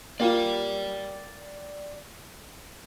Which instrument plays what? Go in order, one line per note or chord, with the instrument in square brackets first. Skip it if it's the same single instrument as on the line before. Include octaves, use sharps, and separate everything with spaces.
[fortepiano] A#3 F4 [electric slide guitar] D5 G5